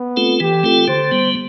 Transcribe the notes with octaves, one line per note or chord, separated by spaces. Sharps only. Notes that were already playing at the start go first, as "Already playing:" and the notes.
Already playing: B3
A3 C4 F4 A4
E3 G4
A3 C4 F4 A4
D3 C5
G3 B3